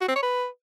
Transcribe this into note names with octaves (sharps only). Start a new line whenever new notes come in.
F#4
C4
C#5
B4